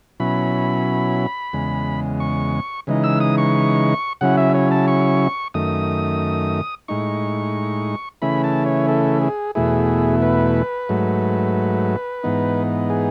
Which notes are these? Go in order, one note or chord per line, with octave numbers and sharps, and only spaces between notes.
B2 F#3 C#4 E4 B5
E2 C#3 G#3
C#6
C#3 E3 G#3 D#4
E6
D#6
C#6
C#3 F#3 C#4 E4 F#5
E5
C#5
A5
C#6
F#2 D#3 A3 D#6
A2 G#3 D#4 C#6
C#3 E3 A3 C#4 E4 B5
A5
C#5
A4
G#4
E2 B2 A3 E4 G#4
B4
G#2 F#3 A3
G#2 E3 B3 D#4
G#4